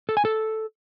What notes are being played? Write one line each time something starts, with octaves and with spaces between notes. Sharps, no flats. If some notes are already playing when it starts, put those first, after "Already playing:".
A4
G#5
A4